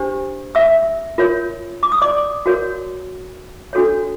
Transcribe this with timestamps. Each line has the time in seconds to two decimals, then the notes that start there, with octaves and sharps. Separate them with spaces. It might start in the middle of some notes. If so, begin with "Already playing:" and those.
Already playing: D4 G4 C5
0.55 E5 E6
1.18 F4 A#4 C#5
1.83 D6
1.92 D#6
2.02 D5 D6
2.46 F#4 A#4 C#5
3.73 D4 F#4 A4 C#5